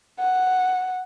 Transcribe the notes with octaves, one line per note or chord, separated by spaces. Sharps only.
F#5